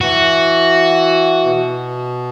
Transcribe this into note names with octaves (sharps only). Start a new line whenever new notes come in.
E3 F#4
B2